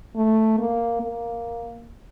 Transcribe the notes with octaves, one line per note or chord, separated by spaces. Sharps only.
A3
A#3
A#3